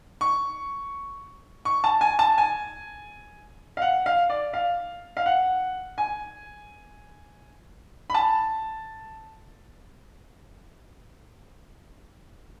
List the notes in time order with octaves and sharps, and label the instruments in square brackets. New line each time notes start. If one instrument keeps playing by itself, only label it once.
[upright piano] C#6
C#6
A5
G#5
A5
G#5
F5
F#5
F5
D5
F5
F5
F#5
G#5
B5
A5